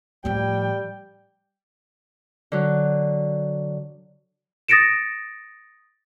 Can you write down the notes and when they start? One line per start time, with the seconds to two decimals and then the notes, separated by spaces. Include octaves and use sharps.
0.25 A2 F3 G3 G5
2.52 D3 F#3
4.68 D#6 A6 A#6 C#7 D7 E7